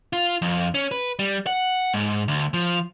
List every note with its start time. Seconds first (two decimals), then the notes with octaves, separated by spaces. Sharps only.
0.13 F4
0.42 F2
0.74 C#4
0.92 B4
1.19 G3
1.47 F#5
1.94 G#2
2.28 D2
2.54 F3